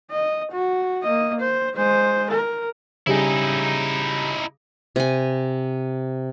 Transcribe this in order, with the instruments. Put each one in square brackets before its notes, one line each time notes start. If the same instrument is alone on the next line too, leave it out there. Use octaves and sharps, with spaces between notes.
[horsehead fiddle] D#5
F#4
A#3 D#5
C5
G#3 C5
A#4
[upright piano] C#3 G3 G#4 [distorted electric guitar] D#4 E4
[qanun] C3 G#5